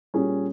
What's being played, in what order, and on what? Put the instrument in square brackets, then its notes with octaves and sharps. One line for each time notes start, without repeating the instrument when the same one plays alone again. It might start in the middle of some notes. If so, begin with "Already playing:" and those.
[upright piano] A#2 G3 C#4 G#4